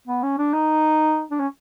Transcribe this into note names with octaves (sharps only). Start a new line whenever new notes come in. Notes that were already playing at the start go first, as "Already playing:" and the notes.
B3
C#4
D4
D#4
D4
C#4